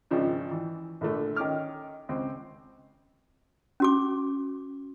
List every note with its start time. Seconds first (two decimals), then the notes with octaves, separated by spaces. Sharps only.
0.11 G#1 G#2 C#3 F3 C#4 D4
0.51 E3
1.01 A#1 D3 A3
1.36 D#3 C#4 D6 F6
2.09 C#2 C4
3.80 C#4 F#4 D6